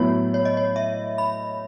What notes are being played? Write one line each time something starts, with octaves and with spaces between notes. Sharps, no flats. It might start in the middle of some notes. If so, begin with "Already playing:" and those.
Already playing: A2 F#3 B3 E4 C#5
C#5
D#5
C#5
E5
B5